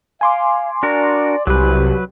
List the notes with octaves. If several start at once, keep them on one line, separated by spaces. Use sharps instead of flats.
F5 G#5 C6 D6
D4 F#4 A#4 D5
C2 F#3 G4 B4